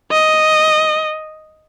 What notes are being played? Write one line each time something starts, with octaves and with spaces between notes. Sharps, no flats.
D#5